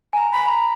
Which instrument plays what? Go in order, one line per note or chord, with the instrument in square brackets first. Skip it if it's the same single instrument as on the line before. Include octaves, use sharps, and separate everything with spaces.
[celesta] G#5 [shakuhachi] A#5
[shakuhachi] B5
A#5